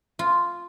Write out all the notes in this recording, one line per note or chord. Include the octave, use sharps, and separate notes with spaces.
F4